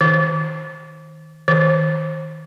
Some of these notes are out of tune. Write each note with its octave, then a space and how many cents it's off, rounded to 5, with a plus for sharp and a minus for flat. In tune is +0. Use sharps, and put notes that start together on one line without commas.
D#3 +20
D#3 +25